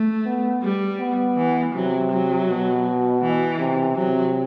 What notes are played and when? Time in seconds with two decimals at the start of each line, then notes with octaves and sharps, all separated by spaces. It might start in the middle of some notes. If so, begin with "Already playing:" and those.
Already playing: A3
0.26 B3
0.63 G3
1.00 B3
1.37 E3
1.75 C3 F#3
2.11 F#3
2.49 B2
3.22 E3
3.59 C3
3.96 C3 F#3